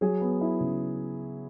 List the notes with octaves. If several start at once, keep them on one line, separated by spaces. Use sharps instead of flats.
F#3 G#4
B3
E4
C#3